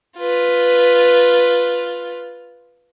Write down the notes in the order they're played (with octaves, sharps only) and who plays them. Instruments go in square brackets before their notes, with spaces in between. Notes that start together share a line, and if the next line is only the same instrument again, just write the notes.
[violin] F4 B4